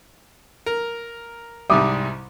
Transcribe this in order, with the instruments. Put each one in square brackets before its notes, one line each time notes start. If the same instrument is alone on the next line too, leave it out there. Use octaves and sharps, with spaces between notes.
[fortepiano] A#4
[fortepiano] C2 G#2 G3 [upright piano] E5 D6 D#6